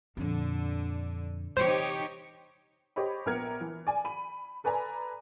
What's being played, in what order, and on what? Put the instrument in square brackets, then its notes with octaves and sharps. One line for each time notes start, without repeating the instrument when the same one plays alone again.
[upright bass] F2 A#2 [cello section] D3
[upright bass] C3 E3 [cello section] D#4 G4 C#5 [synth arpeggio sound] C5
[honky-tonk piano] G4 C5 C#5 D#5 B5
A#1 B3 A#4 F6 G#6 C#7
E3
D5 G#5
B5 D#7
A4 B4 D5 G#5 A#5 B5